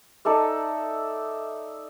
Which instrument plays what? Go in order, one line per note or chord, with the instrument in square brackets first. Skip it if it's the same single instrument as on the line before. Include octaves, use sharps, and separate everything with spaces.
[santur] D#4 A4 D5 E5